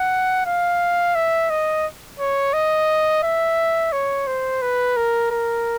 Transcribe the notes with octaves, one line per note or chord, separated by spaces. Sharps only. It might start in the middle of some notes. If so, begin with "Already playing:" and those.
Already playing: F#5
F5
E5
D#5
C#5
D#5
E5
C#5
C5
B4
A#4
A#4